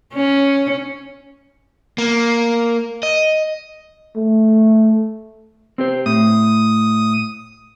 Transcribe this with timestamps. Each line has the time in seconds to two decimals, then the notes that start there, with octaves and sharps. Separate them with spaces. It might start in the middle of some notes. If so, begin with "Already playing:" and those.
0.14 C#4
1.98 A#3
3.03 D#5
4.16 A3
5.78 C4 G4 C5
6.06 A2 D#6